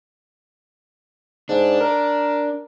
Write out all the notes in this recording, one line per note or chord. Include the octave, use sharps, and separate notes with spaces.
G#2 D4
A#4